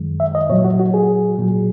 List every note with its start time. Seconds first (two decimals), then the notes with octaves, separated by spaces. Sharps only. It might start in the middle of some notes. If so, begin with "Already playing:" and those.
Already playing: F#2 D#3 G#3
0.20 E5
0.35 D#5
0.49 A#2 F#3 C#5
0.64 F#4
0.80 F#4
0.94 G#4
1.38 A#2 F#3